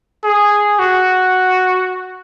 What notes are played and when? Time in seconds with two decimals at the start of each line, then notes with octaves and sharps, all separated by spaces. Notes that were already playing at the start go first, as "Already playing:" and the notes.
0.24 G#4
0.79 F#4